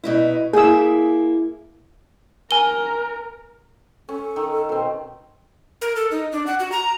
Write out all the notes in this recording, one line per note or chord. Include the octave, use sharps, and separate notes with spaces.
B2 D#4 E4
A#3 E4 G#4 E6
A#4 G#5 G7
C#4 A4
D#3
B2 C4
A#4
A4
D#4
D4
F#5
F#4
A#5